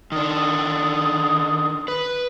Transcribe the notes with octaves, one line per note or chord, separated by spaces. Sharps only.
D#3 D4 D#6
B4